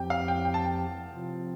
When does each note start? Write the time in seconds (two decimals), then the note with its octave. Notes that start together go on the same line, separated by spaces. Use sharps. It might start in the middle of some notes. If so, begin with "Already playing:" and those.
Already playing: F2 F3 C4 G4 G5
0.10 F5
0.28 G5
0.45 G5
0.54 A5
0.64 G5
1.11 C3 F3 C4 F4